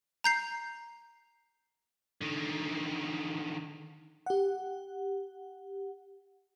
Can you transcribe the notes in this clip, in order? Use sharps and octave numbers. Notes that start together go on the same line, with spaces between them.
A#5 G6 C7
D3 D#3
G4 F#5